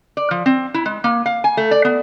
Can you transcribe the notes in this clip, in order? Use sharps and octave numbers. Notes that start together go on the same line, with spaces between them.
D5
F3
C4
E4
G#3
A#3
F5
G#5
A3
D5
B3